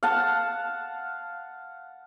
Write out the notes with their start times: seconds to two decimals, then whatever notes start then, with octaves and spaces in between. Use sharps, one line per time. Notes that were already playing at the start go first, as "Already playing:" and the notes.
0.03 F5 F#5 A5